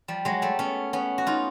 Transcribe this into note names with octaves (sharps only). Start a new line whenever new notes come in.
F3 G3
F#3 G#3
G3 A3
B3 C#4
B3 C#4
F#4
D#4 F4